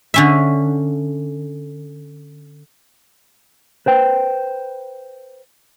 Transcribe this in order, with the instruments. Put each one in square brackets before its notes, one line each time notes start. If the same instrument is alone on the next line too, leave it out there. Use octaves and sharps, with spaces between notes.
[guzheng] D3 C#4 E5
[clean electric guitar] B4 C5 G5